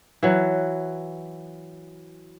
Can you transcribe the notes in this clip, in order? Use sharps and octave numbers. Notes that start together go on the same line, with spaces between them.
E3 F#3